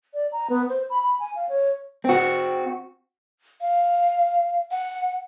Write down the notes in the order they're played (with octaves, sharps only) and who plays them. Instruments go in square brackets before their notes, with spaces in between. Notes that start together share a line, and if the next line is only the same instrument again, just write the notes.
[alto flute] D5
A#5
B3
C5
B5
B5
G#5
F5
C#5
[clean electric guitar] C4 F#4
[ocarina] F5
F#5